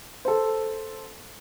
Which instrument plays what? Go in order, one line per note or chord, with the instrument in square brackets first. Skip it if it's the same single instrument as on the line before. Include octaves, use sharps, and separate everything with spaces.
[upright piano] A4 C5